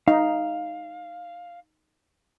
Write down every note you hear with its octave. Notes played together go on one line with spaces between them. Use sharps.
D#4 F5